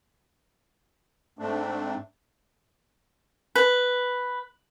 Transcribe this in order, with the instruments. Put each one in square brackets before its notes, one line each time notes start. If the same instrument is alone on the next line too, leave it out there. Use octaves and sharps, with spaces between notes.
[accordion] G#2 A3 C4 D4
[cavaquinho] B4